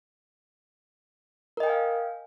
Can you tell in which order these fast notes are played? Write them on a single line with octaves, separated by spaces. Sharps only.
A#4 D#5 G5 G#5 F5